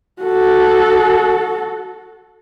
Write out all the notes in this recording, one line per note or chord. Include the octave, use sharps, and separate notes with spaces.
F#4 A4